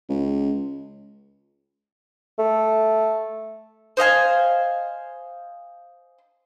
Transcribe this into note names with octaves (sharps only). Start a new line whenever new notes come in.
C#2
A3
C5 D#5 F5 G#5